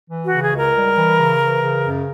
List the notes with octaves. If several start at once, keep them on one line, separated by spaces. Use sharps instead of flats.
E3
F#4
C#3
G#4
C#2
A#4
G3
E3
C#3
E3
C#3
F#2